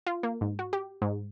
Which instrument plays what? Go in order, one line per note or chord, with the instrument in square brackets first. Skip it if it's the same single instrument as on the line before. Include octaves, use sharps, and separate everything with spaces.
[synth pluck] F4
A#3
G#2
F#4
G4
G#2